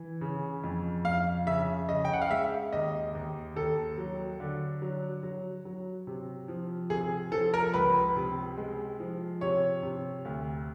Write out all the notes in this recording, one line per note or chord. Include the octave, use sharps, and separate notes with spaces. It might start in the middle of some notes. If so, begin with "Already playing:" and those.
Already playing: E3
C#3
F2
F2 F5
C#3 E5
C#3 D#5
G5
F#5
F5
G#3 E5
D#2 D#5
D#2
D#2 A4
F#3
D3
F#3
F#3
F#3
C3
F3
C3 G#4
F3 A4
A#4
C#2 B4
C3
G#3
F3
C3 C#5
C3
D2